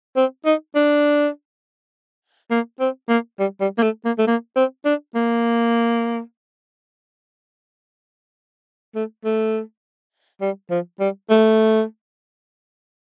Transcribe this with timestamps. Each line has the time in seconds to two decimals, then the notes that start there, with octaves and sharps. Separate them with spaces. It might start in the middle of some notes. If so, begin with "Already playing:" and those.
0.16 C4
0.46 D#4
0.75 D4
2.51 A#3
2.80 C4
3.09 A#3
3.39 G3
3.61 G3
3.78 A#3
3.83 A3
4.05 A#3
4.18 A3
4.27 A#3
4.56 C4
4.85 D4
5.15 A#3
8.95 A3
9.25 A3
10.41 G3
10.70 F3
11.00 G3
11.30 A3